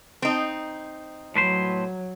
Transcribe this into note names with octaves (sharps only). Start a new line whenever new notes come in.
C4 D#4
A2 F#3 B4 C5